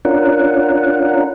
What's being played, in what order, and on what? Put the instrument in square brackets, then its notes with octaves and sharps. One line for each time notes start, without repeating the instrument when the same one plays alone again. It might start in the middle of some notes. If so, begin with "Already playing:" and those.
[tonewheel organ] C#4 D4 F4 A#4 F#5